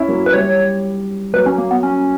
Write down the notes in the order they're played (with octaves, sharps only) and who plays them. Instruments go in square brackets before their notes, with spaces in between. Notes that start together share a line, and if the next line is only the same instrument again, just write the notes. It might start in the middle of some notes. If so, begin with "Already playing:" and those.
Already playing: [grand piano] C#4 E4
F#3 A#3
[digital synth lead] B4
[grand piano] G3 [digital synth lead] C#5
[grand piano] F#3 A#3 [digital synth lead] B4
[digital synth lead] C#4
A#3
B3
C#4